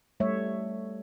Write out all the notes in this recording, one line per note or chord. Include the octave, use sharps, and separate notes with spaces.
G3 A3 C#5 E5